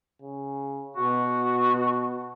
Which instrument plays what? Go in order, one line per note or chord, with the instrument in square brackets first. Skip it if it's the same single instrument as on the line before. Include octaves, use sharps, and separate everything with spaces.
[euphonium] C#3
[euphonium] B2 [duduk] F#4